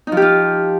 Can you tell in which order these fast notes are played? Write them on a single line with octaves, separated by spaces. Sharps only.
D#4 F3 G4 F4